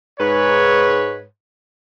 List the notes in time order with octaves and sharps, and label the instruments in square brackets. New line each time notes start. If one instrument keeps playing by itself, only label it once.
[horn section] G#2 B4 C#5